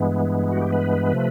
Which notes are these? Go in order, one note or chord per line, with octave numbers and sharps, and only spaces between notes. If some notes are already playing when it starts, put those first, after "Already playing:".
Already playing: G2 E3 G#3 B3
F#4
G4
B4
C3 F3 A3